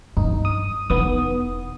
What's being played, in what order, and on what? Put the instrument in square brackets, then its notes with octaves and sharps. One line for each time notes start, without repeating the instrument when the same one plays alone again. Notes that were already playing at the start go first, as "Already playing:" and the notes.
[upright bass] G2 [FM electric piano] D#4
[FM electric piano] D#6
[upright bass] E1 D#4 [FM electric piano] B3 D#6